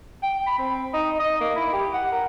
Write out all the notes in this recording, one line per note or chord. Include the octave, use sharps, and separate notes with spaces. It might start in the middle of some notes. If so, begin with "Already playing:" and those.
G5
B5
C4
D#4
D#5
A#3
E4
G4
F#5
A#4